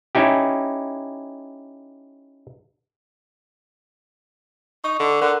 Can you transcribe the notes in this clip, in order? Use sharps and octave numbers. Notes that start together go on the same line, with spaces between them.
C#4 D#4 E4 G4
D#4 C#6
D3
D3 A#4 F#5 F#6